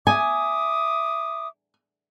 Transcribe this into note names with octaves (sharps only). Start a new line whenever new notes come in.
E5 G#5 D6 D#6